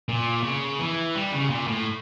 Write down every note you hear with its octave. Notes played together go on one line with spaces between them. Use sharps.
A#2
C#3
E3
G3
C#3
A#2
A2